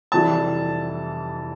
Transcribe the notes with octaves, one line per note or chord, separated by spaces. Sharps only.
F1 F2 E3 G3 A5